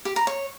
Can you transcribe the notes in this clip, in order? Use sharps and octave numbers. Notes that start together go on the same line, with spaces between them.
G4
A#5
C#5